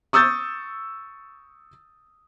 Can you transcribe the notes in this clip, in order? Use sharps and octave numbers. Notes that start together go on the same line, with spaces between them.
C#6 D#6 E6 G6 A6